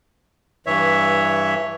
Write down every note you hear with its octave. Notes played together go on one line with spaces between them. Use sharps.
G2 E3 C#5 E5